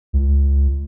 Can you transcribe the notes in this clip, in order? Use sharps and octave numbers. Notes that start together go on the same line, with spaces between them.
C#2